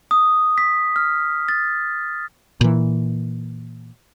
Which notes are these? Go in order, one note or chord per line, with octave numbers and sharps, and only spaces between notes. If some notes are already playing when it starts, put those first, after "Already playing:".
D#6
B6
F6
A6
A#2 E3